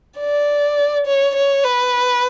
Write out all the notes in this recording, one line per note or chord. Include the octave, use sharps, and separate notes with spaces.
D5
C#5
C#5
B4